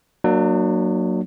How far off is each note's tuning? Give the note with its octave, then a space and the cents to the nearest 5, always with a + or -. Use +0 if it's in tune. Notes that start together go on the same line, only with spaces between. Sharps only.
F#3 +0 A#3 +0 D4 +40